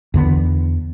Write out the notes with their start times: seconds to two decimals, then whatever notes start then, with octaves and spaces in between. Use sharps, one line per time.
0.14 E2 D3 B3